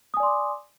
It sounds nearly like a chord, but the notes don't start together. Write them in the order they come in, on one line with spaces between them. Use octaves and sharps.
D#6 G#5 D5 C6 D6